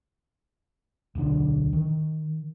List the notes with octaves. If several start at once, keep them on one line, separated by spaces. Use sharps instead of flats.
D1 B1 D3 D4
D#3